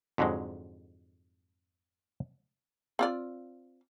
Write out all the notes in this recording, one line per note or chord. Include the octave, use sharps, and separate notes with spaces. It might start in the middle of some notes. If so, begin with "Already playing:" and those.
F2 G#2 D3 F#3 G#3
C4 F4 D5